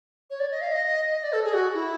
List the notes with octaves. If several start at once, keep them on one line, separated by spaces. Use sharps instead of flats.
C#5
D5
D#5
F5
D#5
D#5
D5
A4
G#4
F#4
E4